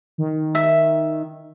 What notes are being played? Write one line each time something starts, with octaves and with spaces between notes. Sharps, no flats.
D#3
E5